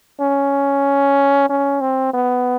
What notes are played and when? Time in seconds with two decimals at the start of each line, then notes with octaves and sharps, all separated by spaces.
0.21 C#4
1.50 C#4
1.81 C4
2.13 B3